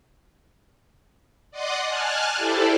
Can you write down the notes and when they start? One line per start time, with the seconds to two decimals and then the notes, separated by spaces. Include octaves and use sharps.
1.51 D5 D#5 F#5 C6 D6 D#6
1.85 G#5 A5 F6 F#6
2.35 E4 G4 A4 C5 D5